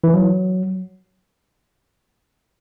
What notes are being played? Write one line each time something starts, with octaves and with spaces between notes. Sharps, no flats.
E3
F#3